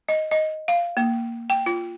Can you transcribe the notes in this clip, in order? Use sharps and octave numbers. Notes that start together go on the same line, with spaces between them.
D#5
D#5
F5
A#3
G5
F4